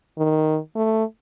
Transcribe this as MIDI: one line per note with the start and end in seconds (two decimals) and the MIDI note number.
0.18 0.59 51
0.76 1.04 57